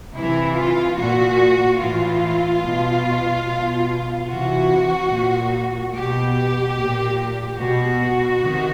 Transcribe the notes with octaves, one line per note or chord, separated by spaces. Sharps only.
C3 E3 E4
F4
A#2 F#4
A2 E3 F4
B2
B2
C3 E3 F#4
A#2
B2 G4
A#2
B2 F#4
C3 D#3